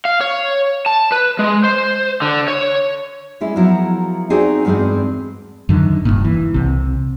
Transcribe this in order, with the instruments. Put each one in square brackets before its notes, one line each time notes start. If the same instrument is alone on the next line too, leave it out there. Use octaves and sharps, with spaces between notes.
[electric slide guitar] F5
C#5
A5
B4
G#3
C5
D3
C#5
[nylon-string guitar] G3 G#3 C#4 E4
F3 F#3 B3 E4 A#4
C4 D#4 F#4 G#4 C5 D5
E2 G2 G#3 C4 G#4
[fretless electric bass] F#2 D3 D#3
E1 C#2 G2 A#2
E3
C2 C3